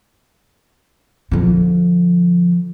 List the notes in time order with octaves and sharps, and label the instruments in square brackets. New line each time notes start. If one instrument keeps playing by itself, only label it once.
[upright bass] D3 F3